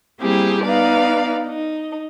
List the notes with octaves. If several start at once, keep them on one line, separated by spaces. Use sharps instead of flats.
G3 A#3 C4 E4 G4 G#4
B3 D#4 B4 D5 F5
D#4